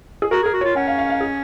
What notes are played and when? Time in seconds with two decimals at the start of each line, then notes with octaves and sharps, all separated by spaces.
0.22 G#4
0.31 F#4 A#4
0.43 G#4 A#4
0.54 F#4
0.61 F4 C#5
0.75 C#4 F#5
0.87 F5
0.99 F5
1.10 F5
1.21 G#4